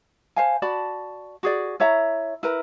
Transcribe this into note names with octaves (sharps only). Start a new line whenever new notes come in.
C5 F5 G#5
F#4 D5 A5 B5
F#4 G#4 D5
E4 C#5 E5 A#5
E4 A#4 B4 A#5